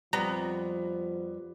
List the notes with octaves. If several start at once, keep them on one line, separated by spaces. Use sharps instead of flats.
F2 F3 G3 B3 A#5